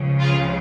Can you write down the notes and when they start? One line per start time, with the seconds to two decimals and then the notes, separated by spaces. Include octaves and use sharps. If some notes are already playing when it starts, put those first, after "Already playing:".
Already playing: C#2 C#3 F3
0.20 F4 G#4